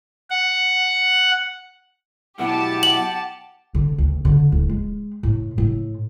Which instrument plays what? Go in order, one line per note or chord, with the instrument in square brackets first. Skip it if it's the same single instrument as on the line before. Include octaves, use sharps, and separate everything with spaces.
[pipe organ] F#5
[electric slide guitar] F#2 B2 E4 [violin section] G4 A5 [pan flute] F#5
[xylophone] F#7
[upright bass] D3
D2
D3
D1
G#3
A2
A2